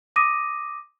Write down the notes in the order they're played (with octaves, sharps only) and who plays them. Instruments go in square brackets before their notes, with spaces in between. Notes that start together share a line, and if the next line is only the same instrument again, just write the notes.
[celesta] D6 D#6 A#6 D#7